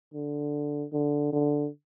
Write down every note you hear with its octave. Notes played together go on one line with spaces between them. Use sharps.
D3
D3
D3